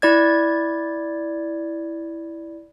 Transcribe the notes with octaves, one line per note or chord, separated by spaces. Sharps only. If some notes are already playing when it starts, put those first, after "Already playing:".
E4 D5 G#6